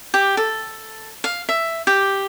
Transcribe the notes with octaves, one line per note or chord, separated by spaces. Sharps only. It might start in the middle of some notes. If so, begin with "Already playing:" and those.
G4
A4
F5
E5
G4